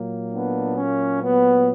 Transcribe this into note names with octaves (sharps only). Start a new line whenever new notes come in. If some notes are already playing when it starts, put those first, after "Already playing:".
Already playing: A#2 F#3 A#3
B3 D4
A#3 C#4
B3